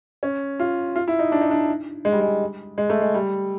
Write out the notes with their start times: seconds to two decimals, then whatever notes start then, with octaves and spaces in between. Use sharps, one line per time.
0.23 C#4
0.60 F4
0.96 F4
1.08 E4
1.19 D#4
1.32 D4
1.41 D#4
1.51 D4
2.05 G#3
2.12 G3
2.21 G#3
2.78 G#3
2.90 A3
3.01 G#3
3.14 G3